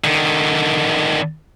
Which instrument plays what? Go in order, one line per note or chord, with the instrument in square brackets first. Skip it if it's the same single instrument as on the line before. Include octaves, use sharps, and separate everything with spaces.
[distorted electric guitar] D3 D#3